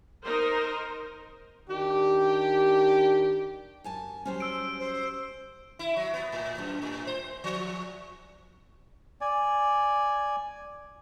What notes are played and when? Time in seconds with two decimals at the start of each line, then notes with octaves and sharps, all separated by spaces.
0.24 D#4 A#4 C5
1.68 D#3 D4 G4
3.84 F#2 G#5 A5
4.25 F#3 G3 C#4 C5
4.40 E6 D7
4.79 C5
5.79 E4
5.97 F#3
6.14 B3
6.32 A2
6.58 F#2
6.82 A2
7.07 C5
7.44 F3
9.21 D5 G#5